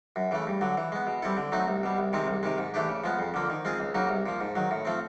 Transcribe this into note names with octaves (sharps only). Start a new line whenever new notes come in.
F#2
C#3 E3 A3
G2
D3 F#3
E3
G#3 B3
B2
G3 C4 E4 A4
D3
F#3 A3 C4 D#4
C2
B2 G3
C2
C3 D#3 G#3 C4
C2
C3 D#3 G#3
G#2
E3 A3 D4 G4
C#3
F3 G#3 B3
F2
D3 F3 A#3
D#3
G#3 C4 F4 G#4
C#2
C#3 F#3 A#3 D#4
C2
A#2 F3
G#2
D#3 F#3
A2
F3 A3 C4